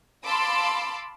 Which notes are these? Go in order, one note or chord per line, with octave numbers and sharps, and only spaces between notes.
F5 A5 B5 C6 D6 E6